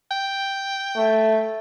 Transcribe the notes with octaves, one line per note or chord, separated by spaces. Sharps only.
G5
A3